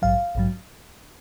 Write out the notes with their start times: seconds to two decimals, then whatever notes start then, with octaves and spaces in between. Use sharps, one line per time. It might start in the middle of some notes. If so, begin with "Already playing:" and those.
0.02 A#1 G#2 F#3 F5
0.35 A#1 G#2 F#3